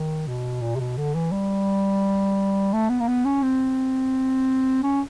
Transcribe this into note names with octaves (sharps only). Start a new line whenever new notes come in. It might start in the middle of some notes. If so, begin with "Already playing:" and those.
Already playing: D#3
B2
A#2
C3
B2
D3
E3
G3
A3
B3
A#3
B3
C#4
C4
C#4